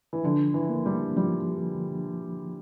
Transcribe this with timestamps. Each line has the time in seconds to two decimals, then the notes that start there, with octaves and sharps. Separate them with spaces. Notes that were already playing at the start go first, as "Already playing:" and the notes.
0.13 E3
0.24 D3 F3
0.54 E3
0.69 A#3
0.86 G3
1.16 F3 G3